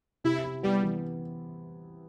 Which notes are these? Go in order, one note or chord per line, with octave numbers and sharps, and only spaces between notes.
C3 E4
E4
G3 B3
E3